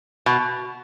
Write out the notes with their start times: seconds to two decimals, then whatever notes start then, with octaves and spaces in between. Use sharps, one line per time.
0.26 B2